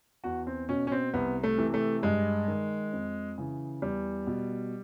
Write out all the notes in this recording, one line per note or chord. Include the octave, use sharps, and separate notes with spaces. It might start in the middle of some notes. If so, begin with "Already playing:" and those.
E2 F#4
C4
B2 C#4
C#4
C4
C2 B3
A3
C3 E3
A3
G2 G#3
D#3
F2
C#3 E3
E2 G3
B2